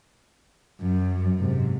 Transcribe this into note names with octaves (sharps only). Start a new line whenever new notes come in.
F#2
G#2 C3